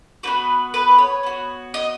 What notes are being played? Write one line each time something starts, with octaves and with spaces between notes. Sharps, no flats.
B3 D#4 F#4 B4
B4
C#5
B3 F#4
D#5